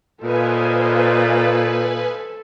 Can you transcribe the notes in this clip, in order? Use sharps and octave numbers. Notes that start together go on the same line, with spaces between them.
A#2 A4 B4 C5 D#5 F5 G#5